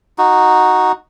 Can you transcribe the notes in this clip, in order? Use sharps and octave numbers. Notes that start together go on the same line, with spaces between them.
D#4 F#4